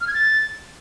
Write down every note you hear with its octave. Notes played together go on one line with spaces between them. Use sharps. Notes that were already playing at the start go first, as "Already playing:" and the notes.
F6
G#6
A6